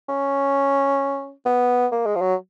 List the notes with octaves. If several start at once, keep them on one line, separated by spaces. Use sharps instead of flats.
C#4
B3
A#3
G#3
F3
F#3